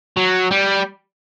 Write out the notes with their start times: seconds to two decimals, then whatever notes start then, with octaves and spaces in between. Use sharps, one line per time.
0.17 F#3
0.51 G3